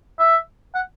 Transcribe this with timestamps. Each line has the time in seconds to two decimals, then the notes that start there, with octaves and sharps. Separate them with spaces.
0.19 E5
0.75 F#5